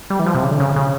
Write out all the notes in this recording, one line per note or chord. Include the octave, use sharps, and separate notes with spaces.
G3
E3
F3
C3
C#3
D3
C#3
C#3